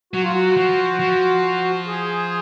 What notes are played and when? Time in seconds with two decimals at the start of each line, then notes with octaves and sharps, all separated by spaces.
0.13 F#3 F#4
0.23 F4
0.32 F#4
0.57 F3
1.00 F3
1.87 G#4